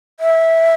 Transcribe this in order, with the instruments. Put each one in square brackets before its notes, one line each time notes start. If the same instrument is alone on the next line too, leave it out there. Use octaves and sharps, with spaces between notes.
[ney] E5